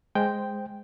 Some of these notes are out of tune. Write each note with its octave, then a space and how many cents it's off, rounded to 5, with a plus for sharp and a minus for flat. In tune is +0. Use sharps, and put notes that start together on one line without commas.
G#3 +0 C5 +0 G5 +0